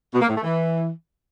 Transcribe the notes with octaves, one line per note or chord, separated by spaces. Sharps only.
B2
A#3
A2
A3
E3